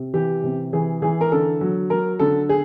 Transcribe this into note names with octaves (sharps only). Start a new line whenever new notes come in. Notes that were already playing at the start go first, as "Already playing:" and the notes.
Already playing: C3
E3 G4
C3
E3 G#4
E3 G#4
A#4
D3 A4
F#3
F#3 A#4
D3 A4
G#4